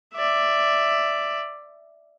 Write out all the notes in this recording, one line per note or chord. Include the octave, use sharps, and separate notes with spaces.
D5 E5